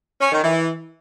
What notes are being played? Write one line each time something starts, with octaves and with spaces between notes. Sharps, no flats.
C#4
D#3
E3